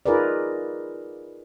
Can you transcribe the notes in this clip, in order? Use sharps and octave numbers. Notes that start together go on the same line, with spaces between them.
D#4 F4 G#4 A#4 B4 D5